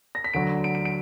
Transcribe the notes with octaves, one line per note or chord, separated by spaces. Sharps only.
A#6
B6
D2 D3 F#3 D7
D7
D7
D7